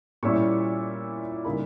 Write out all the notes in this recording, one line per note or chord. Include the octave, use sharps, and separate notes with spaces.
A#2 G3 C#4 E4 C#6
C#3 G3 A#3 D#4 B5